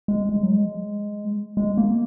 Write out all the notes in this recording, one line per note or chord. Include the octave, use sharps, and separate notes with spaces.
G#3
G#3
F#3
G#3
G#3
A#3